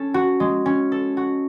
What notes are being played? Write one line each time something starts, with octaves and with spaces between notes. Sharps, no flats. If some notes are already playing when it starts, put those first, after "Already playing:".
Already playing: C#4 A4
F#4
G#3
C#4
A4
F#4